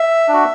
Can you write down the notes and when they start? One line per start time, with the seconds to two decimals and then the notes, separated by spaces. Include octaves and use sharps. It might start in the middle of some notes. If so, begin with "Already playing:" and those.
Already playing: E5
0.28 D4 F#4